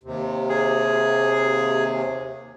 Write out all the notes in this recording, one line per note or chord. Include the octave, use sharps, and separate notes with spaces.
D#2 C3
G#4